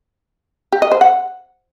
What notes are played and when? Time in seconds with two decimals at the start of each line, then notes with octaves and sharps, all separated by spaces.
0.72 G4
0.82 D#5
0.92 C5
1.01 F#5